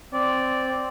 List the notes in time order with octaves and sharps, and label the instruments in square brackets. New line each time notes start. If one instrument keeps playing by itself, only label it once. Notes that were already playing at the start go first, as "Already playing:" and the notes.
[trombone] C4 [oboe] D5